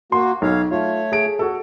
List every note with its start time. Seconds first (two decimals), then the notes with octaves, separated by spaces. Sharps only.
0.12 A#3 F#4 C6
0.42 B1 C#5 F5
0.71 A3 F4 C#5
1.12 G#4 D7
1.39 F#4 A4